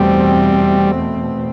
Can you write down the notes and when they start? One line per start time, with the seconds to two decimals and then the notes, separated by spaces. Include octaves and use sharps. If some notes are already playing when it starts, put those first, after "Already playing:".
Already playing: E2 B2 G3 A3 C4